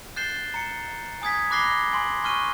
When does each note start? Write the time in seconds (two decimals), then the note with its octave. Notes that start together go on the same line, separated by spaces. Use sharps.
0.16 F#6 G6 A6 C7 E7 G7
0.54 A#5 C#7
1.22 G#5 D#6 G#6 B6
1.51 B5 D6 F#6 A#6 C7 G7
1.93 G#5 C6
2.24 G#5 C#6 F6 F#6 D#7